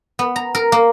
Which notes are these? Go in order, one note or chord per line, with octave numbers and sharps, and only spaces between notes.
B3
A#5
A#4
A#3